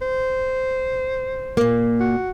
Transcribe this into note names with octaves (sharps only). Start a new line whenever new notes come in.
C5
A#2 A#3
F#4